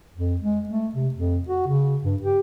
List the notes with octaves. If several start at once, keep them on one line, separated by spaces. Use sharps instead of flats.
F2
G#3
A3
C3
F2
F#4
C#3
G2
G4